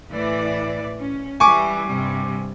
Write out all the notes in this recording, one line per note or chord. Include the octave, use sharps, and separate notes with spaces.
A2 E3 D5
C#4
E3 G3 G#5 C#6 D6
G2 C3 G3